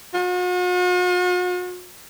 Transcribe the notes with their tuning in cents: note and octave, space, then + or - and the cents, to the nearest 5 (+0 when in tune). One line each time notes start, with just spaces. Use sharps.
F#4 -45